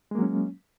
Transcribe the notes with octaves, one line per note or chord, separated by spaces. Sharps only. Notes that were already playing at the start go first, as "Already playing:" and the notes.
F#3 G#3 A#3 C#4